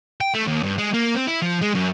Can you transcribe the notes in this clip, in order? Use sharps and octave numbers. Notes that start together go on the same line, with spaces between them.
G5
A3
D#2
G2
G#3
A#3
C4
E4
F3
G#3
F#2